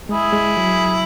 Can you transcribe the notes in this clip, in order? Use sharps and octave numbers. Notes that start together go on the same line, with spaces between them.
G#3 E4 G#4
G#3
F#3